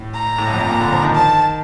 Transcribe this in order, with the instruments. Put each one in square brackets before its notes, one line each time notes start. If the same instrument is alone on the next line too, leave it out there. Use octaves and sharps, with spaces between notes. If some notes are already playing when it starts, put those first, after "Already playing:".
Already playing: [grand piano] A2
[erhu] A#5
[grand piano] A2
G2
F2
G2
A#2
D3
F3
D#3
[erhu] A5